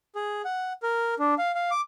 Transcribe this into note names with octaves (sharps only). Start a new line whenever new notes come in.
G#4
F#5
A#4
D4
F5
F5
D6